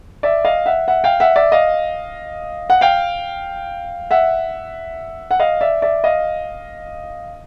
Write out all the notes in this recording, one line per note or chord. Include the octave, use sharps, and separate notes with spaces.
D5 E5
D#5 F5
E5 F#5
E5 F#5
F5 G5
E5 F#5
D5 E5
D#5 F5
F#5
F5 G5
E5 F#5
F#5
D#5 F5
D5 E5
D5 E5
D#5 F5